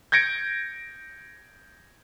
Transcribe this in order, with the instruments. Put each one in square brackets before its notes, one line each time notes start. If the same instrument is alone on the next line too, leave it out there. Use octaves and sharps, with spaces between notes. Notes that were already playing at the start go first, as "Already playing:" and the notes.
[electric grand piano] G6 G#6 A#6 C#7 D7